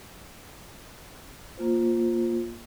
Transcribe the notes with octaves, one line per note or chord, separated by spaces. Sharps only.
A#3 F4 C5